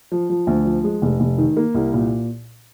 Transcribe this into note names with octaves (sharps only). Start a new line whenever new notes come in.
F3
F3
D2
F3
G#3
F1
F1
D#3
A#3
C2
A#2